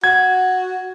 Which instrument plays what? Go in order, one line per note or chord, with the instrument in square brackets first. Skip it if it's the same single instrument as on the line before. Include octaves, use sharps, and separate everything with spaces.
[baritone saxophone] F#4 [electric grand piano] G#6